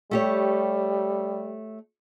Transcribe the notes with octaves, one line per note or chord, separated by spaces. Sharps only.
G3 A3 G4 C#5